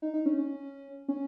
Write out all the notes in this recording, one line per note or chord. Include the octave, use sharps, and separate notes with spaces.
D#4
D#4
C#4
C#4
C#4